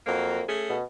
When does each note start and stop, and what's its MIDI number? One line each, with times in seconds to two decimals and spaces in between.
0.07 0.46 41
0.07 0.42 54
0.07 0.42 58
0.49 0.77 57
0.49 0.77 61
0.49 0.77 68
0.69 0.83 47